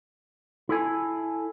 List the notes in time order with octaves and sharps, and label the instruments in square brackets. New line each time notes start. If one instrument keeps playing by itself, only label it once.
[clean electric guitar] E4 A4 G#5